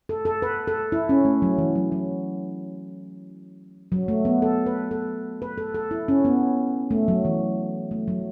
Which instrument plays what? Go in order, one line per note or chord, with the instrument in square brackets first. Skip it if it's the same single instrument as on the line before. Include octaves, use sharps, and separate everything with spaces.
[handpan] A4
A4
B4
A4
E4
C#4
A3
F#3
E3
F#3
F#3
F#3
A3
B3
A4
B4
A4
B4
A4
A4
E4
C#4
B3
A3
F#3
E3
A3
F#3